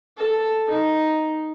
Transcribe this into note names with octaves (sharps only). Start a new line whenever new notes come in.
A4
D#4